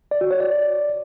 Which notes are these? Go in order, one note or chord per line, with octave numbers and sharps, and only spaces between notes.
D5
F#4
C#5
D5